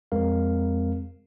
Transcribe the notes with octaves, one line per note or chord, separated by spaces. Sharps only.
F2 G#3 C4 A#4 F5